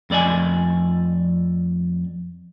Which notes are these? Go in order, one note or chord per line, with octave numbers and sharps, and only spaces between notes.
F2 A3 D5 D#5 G#5